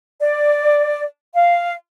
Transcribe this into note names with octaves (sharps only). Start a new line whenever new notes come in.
D5
F5